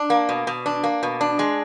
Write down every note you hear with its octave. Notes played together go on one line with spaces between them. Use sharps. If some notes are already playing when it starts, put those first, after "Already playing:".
Already playing: D4
A#3
B2
B2
D4
A#3
B2
D4
G#3